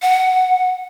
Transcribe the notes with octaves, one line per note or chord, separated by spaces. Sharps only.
F#5